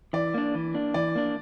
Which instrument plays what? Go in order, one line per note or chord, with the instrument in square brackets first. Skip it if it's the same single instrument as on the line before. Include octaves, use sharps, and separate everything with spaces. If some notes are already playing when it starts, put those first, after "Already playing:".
[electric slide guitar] E3 [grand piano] D5
[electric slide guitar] A#3 D4
E3
A#3 D4
[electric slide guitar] E3 [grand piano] D5
[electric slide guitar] A#3 D4